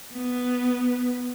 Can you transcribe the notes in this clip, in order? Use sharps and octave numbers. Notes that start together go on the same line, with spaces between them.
B3